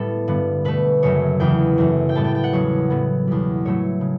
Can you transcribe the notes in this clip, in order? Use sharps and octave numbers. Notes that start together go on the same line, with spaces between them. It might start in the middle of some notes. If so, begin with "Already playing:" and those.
Already playing: A2 G3 A3 B3 A4
G2 D3 G3 B3
B2 A3 B4
F#2 C#3 F#3 A3 C#5
E2 C#3 E3 A3 G5
F#2 E3 A3
G5
A2 G3 B3 A5
G5
G5
F#5
E2 C#3 F#3 C#5
A2 F#3 B3
E2 B2 G3
A2 F#3 A3 C#5
C#3